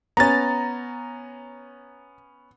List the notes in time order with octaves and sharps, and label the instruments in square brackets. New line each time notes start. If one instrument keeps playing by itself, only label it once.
[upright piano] B3 C#4 [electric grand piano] A#5 A6